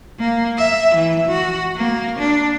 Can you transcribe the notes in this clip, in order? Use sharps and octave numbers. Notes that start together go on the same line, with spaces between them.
A#3
E5
E3
F#4
A#3
D4